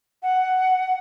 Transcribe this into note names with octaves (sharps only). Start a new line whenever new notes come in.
F#5